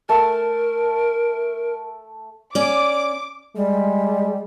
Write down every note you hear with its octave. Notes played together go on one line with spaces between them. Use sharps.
A3 A#4 A5
C#4 D5 D6
G3 G#3